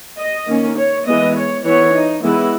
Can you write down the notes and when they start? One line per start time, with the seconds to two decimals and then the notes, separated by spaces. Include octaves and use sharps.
0.18 D#5
0.48 D#3 A#3 C#4
0.77 C#5
1.06 E3 G#3 B3 D#5
1.36 C#5
1.65 E3 B3 C#5
1.94 D#4
2.24 E3 G#3 B3 E4